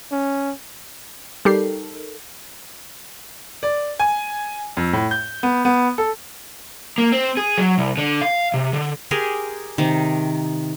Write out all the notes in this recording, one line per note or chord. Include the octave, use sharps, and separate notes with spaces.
C#4
G3 D#4 G4 A4 A#4 C7
D5
G#5
F2
A2
G6
B3
B3
A4
A#3
C4
G#4
F#3
C2
D3
F5
C3
D3
G4 G#4 A#4 C6
C3 D#3